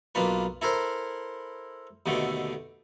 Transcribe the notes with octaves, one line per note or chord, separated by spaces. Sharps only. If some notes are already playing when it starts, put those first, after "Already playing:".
B1 A#3 D4 F4 B4
E4 A4 A#4 C5
D#2 B2 D3 A3